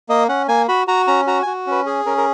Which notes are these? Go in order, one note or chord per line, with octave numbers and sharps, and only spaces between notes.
A#3 D#5
C#4 F#5
A#3 G#5
F#4 B5
F#4 A#5
C#4 A#5
F#4 A#5
F#4 G#5
C#4 B4
G#4
C#4 A#4
A#4